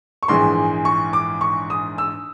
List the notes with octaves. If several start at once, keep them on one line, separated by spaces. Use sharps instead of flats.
C#6
A#1 G#2 E3 G#3 C6
C#6
D6
C#6
D#6
E6